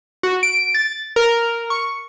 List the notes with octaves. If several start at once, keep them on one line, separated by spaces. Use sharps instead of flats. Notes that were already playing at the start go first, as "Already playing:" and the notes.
F#4
D7
A6
A#4
C#6